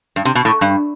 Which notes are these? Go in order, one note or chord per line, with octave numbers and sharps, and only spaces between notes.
G2
C3
B2
A2
G2